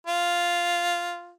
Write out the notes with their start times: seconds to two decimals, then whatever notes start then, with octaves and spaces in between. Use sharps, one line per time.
0.07 F4